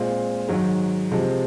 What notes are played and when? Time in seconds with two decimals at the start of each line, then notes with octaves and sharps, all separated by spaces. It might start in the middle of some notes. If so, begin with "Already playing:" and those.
Already playing: A#2 G#3 C4
0.48 G#2 D#3 F#3
1.11 C3 F3 G#3